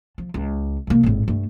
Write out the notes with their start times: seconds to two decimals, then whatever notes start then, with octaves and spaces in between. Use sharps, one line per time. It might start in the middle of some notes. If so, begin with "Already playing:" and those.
0.18 F3
0.34 C#2
0.87 C3 A#3
1.03 G#1 A2
1.28 G2 A3